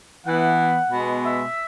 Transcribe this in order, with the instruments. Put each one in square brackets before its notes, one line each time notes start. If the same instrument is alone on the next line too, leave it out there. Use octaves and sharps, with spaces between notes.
[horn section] E3 B3 F#5
B2 G#3 B3
E5